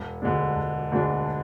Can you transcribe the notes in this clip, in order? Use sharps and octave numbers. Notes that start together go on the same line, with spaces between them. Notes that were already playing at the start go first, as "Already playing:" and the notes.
Already playing: E1
D2 D3 G#3 D4
E1
D2 D3 G#3 D4